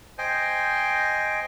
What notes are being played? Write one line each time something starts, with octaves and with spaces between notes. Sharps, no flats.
C5 D#5 G5 G#5